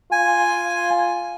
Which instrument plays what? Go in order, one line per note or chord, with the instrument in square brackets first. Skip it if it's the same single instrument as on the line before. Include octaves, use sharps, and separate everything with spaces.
[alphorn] F4 [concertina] G#5